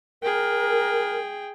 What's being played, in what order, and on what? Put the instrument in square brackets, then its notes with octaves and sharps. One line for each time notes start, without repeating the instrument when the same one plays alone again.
[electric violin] G#4 G5 [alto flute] A#4